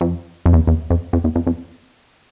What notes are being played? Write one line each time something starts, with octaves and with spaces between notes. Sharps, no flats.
F2
F2
E2
E2
F2
F2
E2
F2
F2